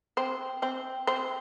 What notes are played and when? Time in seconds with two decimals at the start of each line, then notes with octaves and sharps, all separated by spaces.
0.17 C4 C5
0.62 C4 C5
1.07 C4 C5